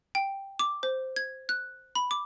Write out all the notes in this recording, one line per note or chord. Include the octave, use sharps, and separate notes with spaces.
G5
D6
C5
G#6
F#6
B5
D6